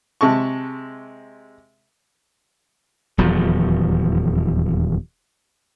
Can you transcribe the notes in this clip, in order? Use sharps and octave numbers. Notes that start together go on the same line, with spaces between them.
C3 G#3 A5 C#6
D#1 E2 F3 F#3